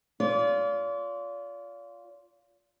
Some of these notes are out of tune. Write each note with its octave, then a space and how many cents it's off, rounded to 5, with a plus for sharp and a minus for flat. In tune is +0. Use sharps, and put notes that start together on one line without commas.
F4 +0 D5 -40